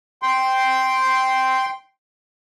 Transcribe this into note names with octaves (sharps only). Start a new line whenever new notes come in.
G5 C6